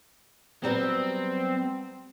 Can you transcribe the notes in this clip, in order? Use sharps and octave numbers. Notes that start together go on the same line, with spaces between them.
F#3 G3 B3 C4